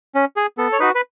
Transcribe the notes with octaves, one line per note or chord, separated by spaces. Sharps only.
C#4
G#4
B3 A4
C#5
D#4 F#4 B4
B4